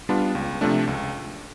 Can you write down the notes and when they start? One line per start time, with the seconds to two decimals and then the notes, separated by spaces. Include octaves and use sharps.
0.09 G3 B3 D4 F4
0.35 C#2
0.61 C3 F3 A3 D4
0.87 C#2